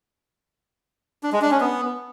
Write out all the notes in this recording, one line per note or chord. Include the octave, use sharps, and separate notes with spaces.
D4
G#3
D4
C#4
B3